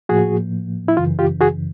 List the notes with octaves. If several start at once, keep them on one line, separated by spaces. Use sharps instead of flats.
A2 F3 A#3 F#4 G#4
E4
F#2 C#3 E3 F4
F4 G4
F#4 G#4